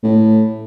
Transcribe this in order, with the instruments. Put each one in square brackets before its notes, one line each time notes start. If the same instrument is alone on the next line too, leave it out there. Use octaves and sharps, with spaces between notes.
[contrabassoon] A2